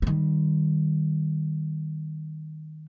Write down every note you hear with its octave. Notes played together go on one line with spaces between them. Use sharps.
D#3 G3